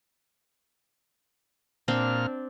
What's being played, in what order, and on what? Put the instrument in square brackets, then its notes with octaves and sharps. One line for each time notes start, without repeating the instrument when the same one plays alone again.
[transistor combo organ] A#2 F6 [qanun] C4 D4